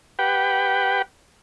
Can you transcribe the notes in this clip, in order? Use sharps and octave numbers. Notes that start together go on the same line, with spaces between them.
G4 B4 F#5 G5